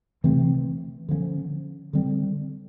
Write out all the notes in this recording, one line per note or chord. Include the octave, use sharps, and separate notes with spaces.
C3 E3 A3 C4
D3 F3 A#3 C#4
D3 G3 C4